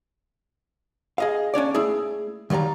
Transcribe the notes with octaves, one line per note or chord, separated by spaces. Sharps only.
G#4 D#5 F5
C#4 D4 C#5 D5
A3 E4 G#4
D#3 F#3 G3 F5 A#5